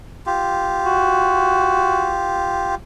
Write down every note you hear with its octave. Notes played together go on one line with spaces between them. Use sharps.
F4 G4
F#4